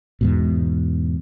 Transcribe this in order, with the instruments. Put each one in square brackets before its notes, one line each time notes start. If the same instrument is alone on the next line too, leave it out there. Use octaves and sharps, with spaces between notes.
[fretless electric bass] E2 G#2 B2